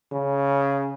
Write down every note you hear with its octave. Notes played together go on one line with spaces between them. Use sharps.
C#3